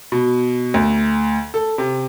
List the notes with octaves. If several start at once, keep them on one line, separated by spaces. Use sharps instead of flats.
B2
D2
A4
C3